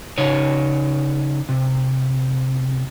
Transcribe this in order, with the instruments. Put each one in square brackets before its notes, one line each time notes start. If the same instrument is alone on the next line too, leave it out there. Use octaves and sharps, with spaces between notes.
[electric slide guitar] C#3 D#4 C#5
C3